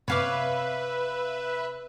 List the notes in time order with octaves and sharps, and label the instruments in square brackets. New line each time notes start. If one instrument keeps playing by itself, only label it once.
[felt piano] C3 [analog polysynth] B4 E5 [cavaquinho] C#5 F5 D6